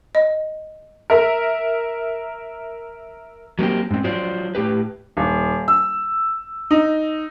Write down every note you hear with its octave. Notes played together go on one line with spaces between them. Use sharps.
D#5
A#4 E5 A#5
F#3 A#3 C4 G4
G#2 C4
F#3 F4 C5 D5
A2 G4 B4
D#1
E6
D#4